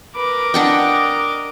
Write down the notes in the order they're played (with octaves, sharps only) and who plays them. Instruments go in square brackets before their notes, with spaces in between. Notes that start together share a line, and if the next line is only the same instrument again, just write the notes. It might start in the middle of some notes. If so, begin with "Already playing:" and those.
[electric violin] A#4 D6 [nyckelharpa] B4
[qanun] D4 F#5 G5 [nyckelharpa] D#5